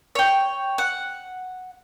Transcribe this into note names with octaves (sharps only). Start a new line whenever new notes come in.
C#5 G5
F#5